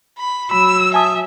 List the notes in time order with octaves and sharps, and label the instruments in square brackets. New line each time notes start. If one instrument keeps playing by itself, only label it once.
[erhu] B5
[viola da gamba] F#3 [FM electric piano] B5 [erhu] E6
[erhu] E5 [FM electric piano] G#5 A5 D#6